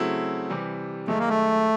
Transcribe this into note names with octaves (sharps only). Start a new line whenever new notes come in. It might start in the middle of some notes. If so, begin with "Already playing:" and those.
Already playing: C#3 F#3 A3 C4 E4
C3 E3 G3
F#2 D#3 G#3 A3
A#3
A3